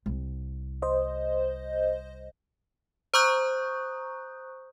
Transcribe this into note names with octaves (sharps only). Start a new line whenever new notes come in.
C2
C5 D#5
C5 A#5 C#6 D#6 F#6 G6